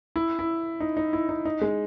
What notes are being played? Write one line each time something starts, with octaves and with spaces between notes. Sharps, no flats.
E4
E4
D#4
D#4
E4
D#4
D#4
G#3